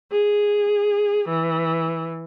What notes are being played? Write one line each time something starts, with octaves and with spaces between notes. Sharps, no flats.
G#4
E3